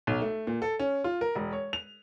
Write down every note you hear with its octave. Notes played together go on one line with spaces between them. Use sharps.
B1
A3
A#2
A4
C#4
F4
A#4
E1
C#5
F7